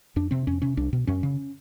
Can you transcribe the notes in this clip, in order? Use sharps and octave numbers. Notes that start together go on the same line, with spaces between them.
F2 D4
C3 C4
F2 C#4
C3 C#4
C2 D4
B2
F#2 C#4
C#3